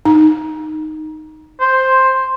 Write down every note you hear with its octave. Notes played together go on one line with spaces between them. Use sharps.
D#4
C5